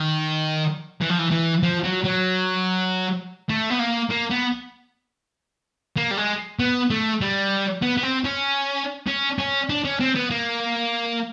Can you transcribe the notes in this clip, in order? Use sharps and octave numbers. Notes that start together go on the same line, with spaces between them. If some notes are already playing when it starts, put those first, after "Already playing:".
Already playing: D#3
E3
F3
E3
E3
F3
F#3
F#3
A3
B3
A#3
A#3
B3
A#3
G3
G#3
B3
A3
G3
B3
B3
C4
C#4
C#4
C#4
D4
C#4
C4
B3
A#3